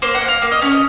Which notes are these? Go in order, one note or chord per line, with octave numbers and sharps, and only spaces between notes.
A#3 C5
F#5
A#3
F5
A#3 F5
D#5
C#4 C#5
D#5